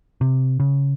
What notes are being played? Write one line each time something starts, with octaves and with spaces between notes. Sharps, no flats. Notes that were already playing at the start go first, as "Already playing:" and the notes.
C3
C#3